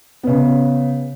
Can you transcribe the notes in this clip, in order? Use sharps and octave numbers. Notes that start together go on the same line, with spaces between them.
C#3 B3